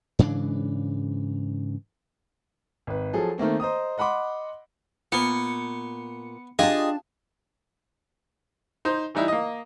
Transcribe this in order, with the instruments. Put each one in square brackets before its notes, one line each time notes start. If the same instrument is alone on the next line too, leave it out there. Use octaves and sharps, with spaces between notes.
[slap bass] G#2 C#3 E3 D4
[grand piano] G#1 B4
F3 F#3 G#4 A4
D#3 A3 A#3 C4
C5 D#5 A#5 D#6
D#5 F#5 B5 C6 D6
[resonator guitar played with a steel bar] A#2 [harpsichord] B3 [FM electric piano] C#7
[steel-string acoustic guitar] D4 A5 [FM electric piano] F4 G4 [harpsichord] G#4 [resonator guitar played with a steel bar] D#5
[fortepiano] D#4 C5
E3 G3 D#4 E4
A#3 D#5